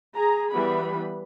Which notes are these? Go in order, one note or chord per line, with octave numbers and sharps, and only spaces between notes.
G#4 A#5
E3 G3 B3 B5